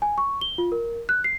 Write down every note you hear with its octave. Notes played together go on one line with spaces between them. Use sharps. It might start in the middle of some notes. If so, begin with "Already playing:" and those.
G#5
C#6
G7
F4
A#4
F#6
C7